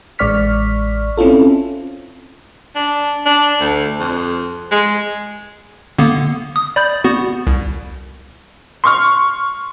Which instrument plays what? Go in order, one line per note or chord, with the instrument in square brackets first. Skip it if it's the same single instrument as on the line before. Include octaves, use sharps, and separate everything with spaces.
[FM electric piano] A1 G#3 D5 C#6 F6 B6
C4 C#4 E4 F4 A4
[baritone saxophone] D4
D4
D2
F2
G#3
[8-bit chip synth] D3 A#3 B3
D#6
D5 B5 G6
B3 F#4
C2
[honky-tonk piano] C6 C#6 F6